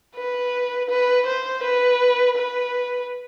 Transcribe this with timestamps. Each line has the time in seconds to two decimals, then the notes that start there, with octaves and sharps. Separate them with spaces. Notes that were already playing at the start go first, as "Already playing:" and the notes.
0.15 B4
0.89 B4
1.26 C5
1.63 B4
2.36 B4